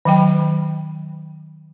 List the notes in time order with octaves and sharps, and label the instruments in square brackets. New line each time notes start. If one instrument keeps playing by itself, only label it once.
[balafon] D#3 F#3 G5